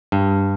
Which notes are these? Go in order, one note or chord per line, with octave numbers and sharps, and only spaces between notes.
G2